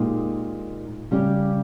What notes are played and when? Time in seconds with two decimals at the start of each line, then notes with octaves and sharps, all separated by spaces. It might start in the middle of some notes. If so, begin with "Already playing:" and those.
Already playing: A#2 G#3 D#4 G4
1.11 C#3 G3 C#4 G4